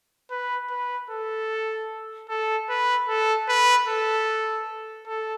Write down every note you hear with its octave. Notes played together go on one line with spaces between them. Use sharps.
B4
B4
A4
A4
B4
A4
B4
A4
A4